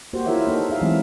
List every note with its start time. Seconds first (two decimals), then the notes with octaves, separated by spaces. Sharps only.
0.13 A#3 F#4 G4 C5
0.26 E4 F4 A#4 C5 C#5 E5
0.47 A#3 D#4 A4
0.69 D#4 G#4 E5 F5
0.82 E3 F#3 G#3 A3 C4 E4